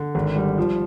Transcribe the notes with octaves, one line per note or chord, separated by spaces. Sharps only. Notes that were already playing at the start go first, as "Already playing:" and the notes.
Already playing: D3
G#1
G3
F3